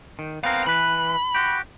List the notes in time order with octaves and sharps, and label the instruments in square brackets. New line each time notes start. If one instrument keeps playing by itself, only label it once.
[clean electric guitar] D#3
[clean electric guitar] B3 C4 A#4 [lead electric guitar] F5
[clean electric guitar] E3 B4 [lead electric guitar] B5
[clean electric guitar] F#4 G4